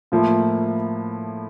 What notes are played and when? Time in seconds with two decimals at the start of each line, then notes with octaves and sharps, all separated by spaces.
0.12 A2 F3 A#3 E4